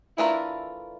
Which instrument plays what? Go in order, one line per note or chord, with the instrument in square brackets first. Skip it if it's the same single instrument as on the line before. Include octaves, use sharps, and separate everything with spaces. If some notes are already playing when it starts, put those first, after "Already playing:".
[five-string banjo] E3 A3 D4 F4 A#4 [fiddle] E4